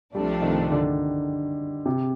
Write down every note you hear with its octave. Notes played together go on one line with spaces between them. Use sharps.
C2 C3 F3 G3 A3 D4
D#3
D3
C3